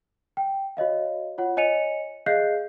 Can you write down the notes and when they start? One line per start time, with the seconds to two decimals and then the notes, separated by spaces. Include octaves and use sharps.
0.37 G5
0.77 F#4 C#5 D#5 F5
1.38 F4 C#5 F#5
1.57 C#5 D#5 G#5 C#7 D#7 F7
2.26 G#4 D#5 F5 F#6 G6 C7